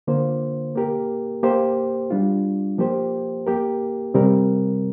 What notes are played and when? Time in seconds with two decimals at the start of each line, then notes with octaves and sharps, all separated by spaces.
0.07 D3 A#3 F4 C5
0.75 A#3 G4 A#4
1.43 A#3 G4 C5
2.11 G3 D4 F4
2.78 F3 A#3 G4 C5
3.47 A#3 G4 A#4
4.14 C3 G3 C4 A#4